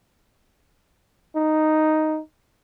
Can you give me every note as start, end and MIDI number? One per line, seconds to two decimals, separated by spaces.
1.36 2.19 63